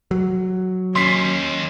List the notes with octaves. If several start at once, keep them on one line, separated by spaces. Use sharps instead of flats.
F#3
D#2 C#4 C6 B6 C7